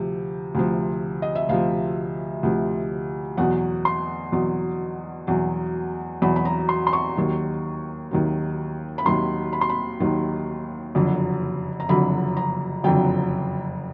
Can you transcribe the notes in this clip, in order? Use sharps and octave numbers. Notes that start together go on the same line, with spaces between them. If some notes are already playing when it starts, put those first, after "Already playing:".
Already playing: D2 C3 F3
D2 C3 F3
D#5
E5
D2 C3 F3 F5
D2 C3 F3
E2 B2 F#3 F#5
C6
E2 B2 F#3
E2 B2 F#3
E2 B2 F#3 B5
B5
A#5
C6
C6
C#6
D#2 D#3 F#3
D#2 D#3 F#3
B5
D#2 D#3 F#3 C6
B5
C6
B5
D#2 D#3 F#3
F#1 F2 D3 F#3
A#5
F#1 F2 D3 F#3 B5
A#5
F#1 F2 D3 F#3 G5